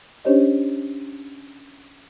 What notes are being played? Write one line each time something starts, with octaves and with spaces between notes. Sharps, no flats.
C#4 D4 G4 C5 C#5 D#5